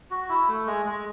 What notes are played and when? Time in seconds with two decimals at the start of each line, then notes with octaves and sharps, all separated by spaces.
0.11 F#4
0.29 E4
0.48 A3
0.66 G#3
0.85 G#3